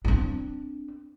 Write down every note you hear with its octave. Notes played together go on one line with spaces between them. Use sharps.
C4 D4